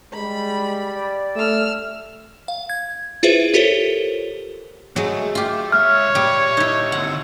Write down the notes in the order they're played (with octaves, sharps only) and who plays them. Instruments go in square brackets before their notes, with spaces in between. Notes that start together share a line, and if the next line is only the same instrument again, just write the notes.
[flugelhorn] G3 [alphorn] G#3 [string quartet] B5
[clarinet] D5
[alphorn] A3 [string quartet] E6 F6
[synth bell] F5
G#6
E4 F4 G#4 B4 C5 E5
F4 G4 A4 A#4 C5 C#5
[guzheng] F#3 G#3 [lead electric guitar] A3
[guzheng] F4 G4
[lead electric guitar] C#2 E5 [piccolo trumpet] C#5 [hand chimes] F6
[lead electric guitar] A#2 G4 [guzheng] G3
[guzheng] D#4 E4
[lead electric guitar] D3 C4 [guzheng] F#5